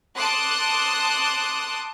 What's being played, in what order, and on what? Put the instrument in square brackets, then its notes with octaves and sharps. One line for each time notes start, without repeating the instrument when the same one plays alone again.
[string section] A5 C6 D6 D#6 F#6